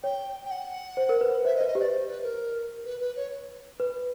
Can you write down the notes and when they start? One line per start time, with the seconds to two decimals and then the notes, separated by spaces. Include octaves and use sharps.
0.03 C#5 G5
0.45 G5
0.51 F#5
0.97 C5
1.09 A#4
1.21 B4
1.45 C5 E5
1.56 D#5
1.61 B4
1.68 D#5
1.75 G4 D5
1.91 C5
2.07 B4
2.23 A#4
2.85 B4
3.01 B4
3.16 C#5
3.80 B4